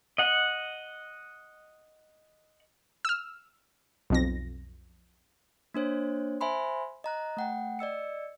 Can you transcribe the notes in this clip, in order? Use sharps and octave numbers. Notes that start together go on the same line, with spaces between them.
D#5 F#5
E6 F6
B1 F2 A#6
A#3 D4 C5 C#5
C5 E5 G#5 B5 C6
D#5 A#5 F#6
A3 F#5 G5
D5 D#5 E6 C#7